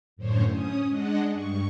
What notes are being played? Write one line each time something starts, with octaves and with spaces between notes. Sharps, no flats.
F#2 A2 D3 C5 C#5
C#4 D#6
G#3 D4 D#5 F#5
G2 C#6